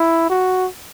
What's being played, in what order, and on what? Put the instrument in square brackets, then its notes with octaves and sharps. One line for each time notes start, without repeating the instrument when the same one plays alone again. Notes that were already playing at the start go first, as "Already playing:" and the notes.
Already playing: [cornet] E4
F#4